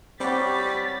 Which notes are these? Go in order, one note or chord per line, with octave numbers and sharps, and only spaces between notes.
G3 C4 G4 C#5 F#5 B5 A6 B6